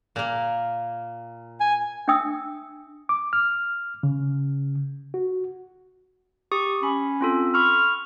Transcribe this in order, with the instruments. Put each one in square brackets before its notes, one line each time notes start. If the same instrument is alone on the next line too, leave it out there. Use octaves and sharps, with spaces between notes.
[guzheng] A#2 A#3
[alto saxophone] G#5
[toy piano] D4 E5 G5 D#6 E6
[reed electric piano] D6
F6
C#3
F#4
[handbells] G4 C#6 D#6
[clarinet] C#4 [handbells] B5
[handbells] C4 F4 A4
[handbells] B5 C#6 [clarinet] F6